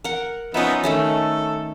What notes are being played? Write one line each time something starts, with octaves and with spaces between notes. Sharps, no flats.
A#4 F#5
F3 B3 C#4 D#4 E5
D#3 A3 C#4 A4